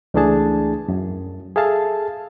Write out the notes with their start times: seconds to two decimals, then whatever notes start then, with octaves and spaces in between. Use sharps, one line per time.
0.14 C#2 E3 A3 D4 G#4 A5
0.88 F#2
1.56 G#4 A4 E5 F5 A5